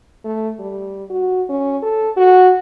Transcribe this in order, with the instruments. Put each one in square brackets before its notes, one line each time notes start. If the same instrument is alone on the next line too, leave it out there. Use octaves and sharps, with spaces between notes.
[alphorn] A3
G3
F#4
C#4
A4
F#4